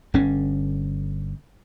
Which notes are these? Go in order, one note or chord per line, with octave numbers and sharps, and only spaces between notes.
G1 D3 C#4